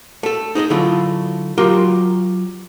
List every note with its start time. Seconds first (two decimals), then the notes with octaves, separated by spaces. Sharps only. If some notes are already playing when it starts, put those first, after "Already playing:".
0.23 A3 A4
0.55 D#4 G#4 C5 D#5
0.70 D3 F#3 A3 E4 F4
1.58 F#3 F4 G4 A#4 C6